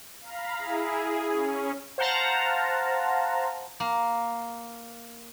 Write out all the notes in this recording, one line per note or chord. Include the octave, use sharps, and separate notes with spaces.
F5 A#5 B5
E4 G#4
G#4
C#4
C5 F5 F#5 A5 A#5
A#3